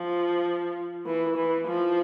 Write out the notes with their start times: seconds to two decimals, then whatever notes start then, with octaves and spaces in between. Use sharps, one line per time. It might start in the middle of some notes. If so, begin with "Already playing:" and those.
Already playing: F3
1.06 E3
1.36 E3
1.67 F3